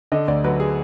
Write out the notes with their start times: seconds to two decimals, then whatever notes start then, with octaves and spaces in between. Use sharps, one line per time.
0.12 D3 D#5
0.28 D2 D5
0.44 F#3 B4
0.60 G#4